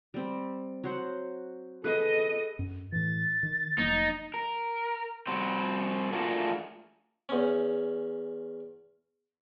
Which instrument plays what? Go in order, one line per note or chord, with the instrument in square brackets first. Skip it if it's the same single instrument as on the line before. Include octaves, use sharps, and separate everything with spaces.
[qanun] G3 C4
F#3 C5 F#5
[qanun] G#4 B4 [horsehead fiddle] A4 D#5
[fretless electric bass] F#2
[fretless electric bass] A2 E3 [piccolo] A6
[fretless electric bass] D#3
[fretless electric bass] F1 F#3 A#3 [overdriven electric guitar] D#4
[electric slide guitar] A#4
G3 C4 F#4 C5
A3 D4 F4 F#4 G#4 A#4
[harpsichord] E2 C#4